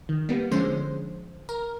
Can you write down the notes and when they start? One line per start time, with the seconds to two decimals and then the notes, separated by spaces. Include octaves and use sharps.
0.09 D#3
0.29 G3 A#3 B3
0.51 D3 F3 G#3 C#4 C5
1.49 A#4